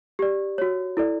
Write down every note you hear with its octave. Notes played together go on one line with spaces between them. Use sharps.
G4 D5
F#4 C#5
E4 A4 D5